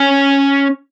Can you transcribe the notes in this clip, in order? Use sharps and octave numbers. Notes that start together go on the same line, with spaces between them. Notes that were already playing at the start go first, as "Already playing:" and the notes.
Already playing: C#4